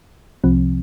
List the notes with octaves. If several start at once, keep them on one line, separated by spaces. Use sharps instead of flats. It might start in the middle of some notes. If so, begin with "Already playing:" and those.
C2 C3 F3 C4